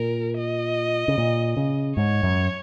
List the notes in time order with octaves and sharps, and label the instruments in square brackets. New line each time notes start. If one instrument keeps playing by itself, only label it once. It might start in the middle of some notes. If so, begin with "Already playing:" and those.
Already playing: [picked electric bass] A#2 [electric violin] A#4
[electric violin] D#5
[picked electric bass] C#3
A#2
C#3
[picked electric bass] G#2 [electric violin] C#5
[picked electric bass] F#2